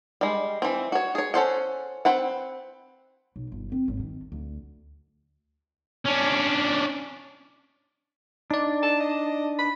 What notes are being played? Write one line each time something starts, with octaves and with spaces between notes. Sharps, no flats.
G3 G#3
E3 C4
F#4 C#5
G#4 C#5
C#4 A4 C5 F#5
C4 B4 F#5
B1
G1
C4
G#1
D#3
D2
C#4 D4
D4 D#4 D5
A5
D#5
B5